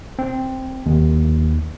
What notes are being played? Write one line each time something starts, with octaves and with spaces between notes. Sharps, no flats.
C4
D#2